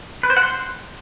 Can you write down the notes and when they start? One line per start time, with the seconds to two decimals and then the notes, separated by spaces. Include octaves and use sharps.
0.23 B4
0.30 C5
0.37 F#5
0.43 C6